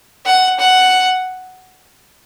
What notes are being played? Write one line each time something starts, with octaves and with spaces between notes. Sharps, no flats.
F#5
F#5